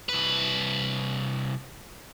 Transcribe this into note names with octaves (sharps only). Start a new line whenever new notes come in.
C2 B4